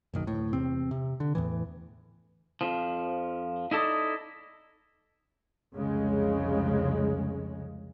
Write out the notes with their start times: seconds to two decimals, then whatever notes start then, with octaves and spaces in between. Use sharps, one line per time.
0.14 F#1 B1 D#3
0.27 D1 A2
0.53 E2 C3 C4
0.91 C3
1.20 D3
1.35 E2 A2 E3
2.61 F2 F3
3.71 D#4 E4 A4 D5 D#5
5.73 F1 C2 C#3 G#3